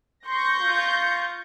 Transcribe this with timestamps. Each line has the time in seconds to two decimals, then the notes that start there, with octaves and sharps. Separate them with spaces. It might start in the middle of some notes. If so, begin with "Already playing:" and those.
0.25 C6 C#6 G6 A#6
0.60 F4